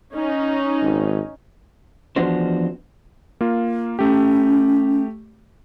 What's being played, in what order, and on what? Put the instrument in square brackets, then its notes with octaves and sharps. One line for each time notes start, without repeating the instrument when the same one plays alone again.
[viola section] C#4 D#4
[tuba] G#1
[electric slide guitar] E2 F3 B3 D4 F#4 C5
[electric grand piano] A#3 F4
[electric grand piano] A3 G4 [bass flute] C#4